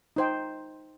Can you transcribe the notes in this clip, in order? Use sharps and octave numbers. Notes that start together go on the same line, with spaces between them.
D#4 C5 G5